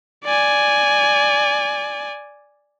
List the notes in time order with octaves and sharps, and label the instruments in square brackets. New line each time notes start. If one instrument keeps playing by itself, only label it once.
[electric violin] D5 G#5